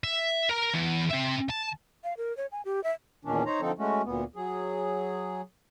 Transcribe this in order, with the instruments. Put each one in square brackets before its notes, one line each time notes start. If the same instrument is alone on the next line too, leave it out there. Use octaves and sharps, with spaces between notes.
[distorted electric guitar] E5
A#4 A#5
E3 B3
C4 E5
A5
[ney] F5
A#4
C#5
G#5
G4
E5
[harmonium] E2 A#2 D#3 C#4 D4
D#4 C5 C#5 A#5
D3 F3 C4 D#4 A4
G#3 A3 C#4 F#4
D2 A#2 B3
F#3 G#4